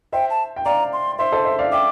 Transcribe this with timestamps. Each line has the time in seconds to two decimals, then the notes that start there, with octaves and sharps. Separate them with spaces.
0.13 C5 E5 G5
0.30 A5
0.56 G5
0.65 D5 F5 A#5
0.93 C6
1.18 C5 E5 C6
1.32 A4 C5
1.45 C5 E5
1.59 D5 F5
1.72 E5 G5 D6